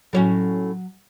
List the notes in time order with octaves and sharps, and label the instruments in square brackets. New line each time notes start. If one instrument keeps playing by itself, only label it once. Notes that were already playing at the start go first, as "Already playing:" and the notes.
[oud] A2 C#4 F#4 [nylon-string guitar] F#3